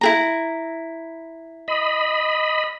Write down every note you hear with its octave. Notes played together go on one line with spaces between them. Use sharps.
E4 G#4 A#5
D#5 B5